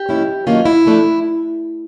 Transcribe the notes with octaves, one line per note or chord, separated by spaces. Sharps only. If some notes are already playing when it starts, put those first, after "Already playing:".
Already playing: G4
G#2 F3 A#3 C#4 E4
G2 D#3 F#3 A#3 C#4 F4
E4
F3 A3 D4